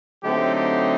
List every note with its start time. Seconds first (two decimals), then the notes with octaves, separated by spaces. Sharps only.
0.23 D3 F#3 A3 C4 D#4 G4
0.55 G4